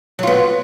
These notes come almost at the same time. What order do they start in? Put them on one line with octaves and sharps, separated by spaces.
F#3 F4 B3